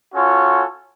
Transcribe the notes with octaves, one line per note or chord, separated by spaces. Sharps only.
C#4 F4 F#4 A4 C#5 G#5